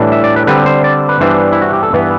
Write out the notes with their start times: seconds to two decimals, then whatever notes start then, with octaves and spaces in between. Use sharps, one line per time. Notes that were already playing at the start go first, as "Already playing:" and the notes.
Already playing: A2 E3 G3 D4
0.12 E5
0.24 D5
0.36 B4
0.47 D3 G3 C4 B4
0.66 C5
0.84 D5
1.09 B4
1.20 G2 E3 G3 B3 D4 C5
1.52 E4
1.62 F#4
1.73 G4
1.83 A4
1.93 G2 E3 B3 B4